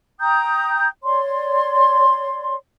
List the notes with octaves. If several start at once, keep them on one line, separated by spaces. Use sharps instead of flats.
G5 A#5 D#6 G6
C#5 D5 C6